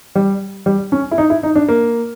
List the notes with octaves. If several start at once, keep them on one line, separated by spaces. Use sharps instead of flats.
G3
G3
C#4
E4
D#4
E4
D#4
D4
A#3